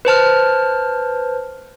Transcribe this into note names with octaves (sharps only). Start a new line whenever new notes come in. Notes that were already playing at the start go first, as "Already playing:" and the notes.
B4 C5 A5 F6